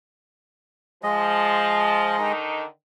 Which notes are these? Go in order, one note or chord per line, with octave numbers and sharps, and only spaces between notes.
F3 G#3 D#5
D3 D#3 D#4